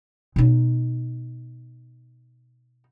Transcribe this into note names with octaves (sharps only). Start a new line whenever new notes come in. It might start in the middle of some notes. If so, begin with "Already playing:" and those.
B2 D#4